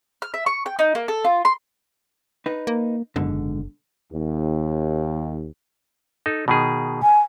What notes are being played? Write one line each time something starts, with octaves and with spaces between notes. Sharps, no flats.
F6
E5
C#6
G5
D#4
A#3
A4
F4
C6
D#4 B4
A#3
F#1 G#2 B2 D3
D#2
D#4 A4
B2 D#3 G#4
G#5